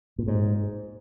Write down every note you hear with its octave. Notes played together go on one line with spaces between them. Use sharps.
A#2
G#2